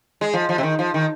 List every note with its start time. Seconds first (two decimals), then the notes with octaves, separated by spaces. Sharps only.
0.21 G#3
0.34 F3
0.49 F3
0.58 C3
0.63 D#3
0.79 F3
0.94 D#3